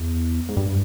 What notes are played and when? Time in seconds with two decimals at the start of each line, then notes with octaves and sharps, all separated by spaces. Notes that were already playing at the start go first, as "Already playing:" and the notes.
Already playing: E2
0.49 G#2
0.57 G2